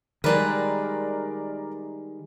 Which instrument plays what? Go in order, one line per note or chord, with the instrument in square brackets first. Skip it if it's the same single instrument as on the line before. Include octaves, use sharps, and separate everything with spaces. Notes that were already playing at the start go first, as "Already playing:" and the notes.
[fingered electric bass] D#3 [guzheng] G3 G#3 B4 [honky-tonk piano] A#4 D5